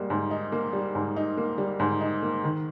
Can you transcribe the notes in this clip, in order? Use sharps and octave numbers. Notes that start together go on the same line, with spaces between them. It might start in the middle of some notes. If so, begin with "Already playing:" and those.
Already playing: G#2 G3 A#3
G#2
D#4
A#3
G3
G#2
D#4
A#3
G3
G#2
D#4
A#3
D#3